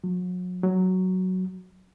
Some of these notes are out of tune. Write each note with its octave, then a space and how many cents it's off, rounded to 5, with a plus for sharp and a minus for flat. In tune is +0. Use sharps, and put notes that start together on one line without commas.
F#3 -35
F#3 +5